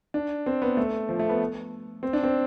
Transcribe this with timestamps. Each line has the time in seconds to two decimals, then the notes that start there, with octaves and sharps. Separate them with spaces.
0.14 D4
0.46 C4
0.62 B3
0.77 A3
1.09 F3
1.19 A3
1.29 B3
2.03 C4
2.13 D4
2.23 C4